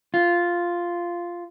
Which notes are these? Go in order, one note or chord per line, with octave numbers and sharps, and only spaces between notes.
F4